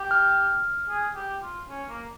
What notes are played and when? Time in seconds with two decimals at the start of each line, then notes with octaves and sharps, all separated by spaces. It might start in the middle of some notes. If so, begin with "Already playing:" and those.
Already playing: G4
0.11 F6
0.89 G#4
1.16 G4
1.43 F4
1.69 C#4
1.89 A#3